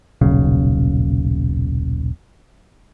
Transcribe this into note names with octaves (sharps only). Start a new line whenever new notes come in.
D#1 B1 C#3